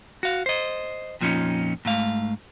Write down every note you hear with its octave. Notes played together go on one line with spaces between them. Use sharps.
F#4 F5
C5 D#5
F2 A#2 F3 C4 C#4 D#4
G#2 A3 F5